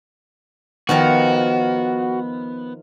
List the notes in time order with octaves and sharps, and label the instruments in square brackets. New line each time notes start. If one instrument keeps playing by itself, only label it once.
[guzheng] D#3 F3 A#4 [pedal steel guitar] B3 [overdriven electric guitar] F#4